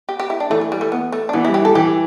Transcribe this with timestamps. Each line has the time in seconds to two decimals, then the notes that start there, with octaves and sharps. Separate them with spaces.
0.09 G4
0.20 G4
0.30 E4
0.40 D4
0.50 E3 A3
0.61 A3
0.72 G3
0.81 A3
0.92 B3
1.12 A3
1.29 D4
1.33 E3 B3
1.45 G3 E4
1.54 G4
1.62 E3
1.65 A4
1.70 G3
1.75 E3 G4